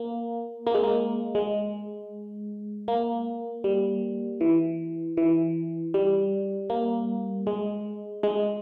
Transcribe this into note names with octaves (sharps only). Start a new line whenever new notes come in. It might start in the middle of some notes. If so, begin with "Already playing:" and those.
Already playing: A#3
A#3
G#3
A#3
G#3
A#3
G3
E3
E3
G3
A#3
G#3
G#3